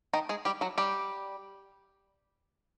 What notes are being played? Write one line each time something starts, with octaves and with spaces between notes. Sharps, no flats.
D#3 D#4
G#3 G#4
G3 G4
F#3 F#4
G3 G4